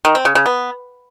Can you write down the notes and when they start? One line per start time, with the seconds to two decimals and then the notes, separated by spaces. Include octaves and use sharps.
0.05 D#3
0.15 C4
0.25 C#3
0.35 C#3
0.46 B3